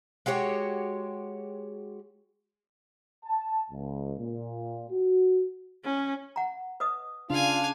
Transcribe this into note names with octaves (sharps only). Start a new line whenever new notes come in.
G#3 F#4 G4 C#5
A5
C#2
A#2
F#4
C#4
F#5 A#5
B4 D#5 D#6
C#3 D4 F4 F5 G#5